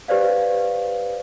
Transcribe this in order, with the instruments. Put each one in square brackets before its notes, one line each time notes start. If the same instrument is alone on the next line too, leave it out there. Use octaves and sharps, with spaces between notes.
[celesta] G4 B4 C5 D5 F5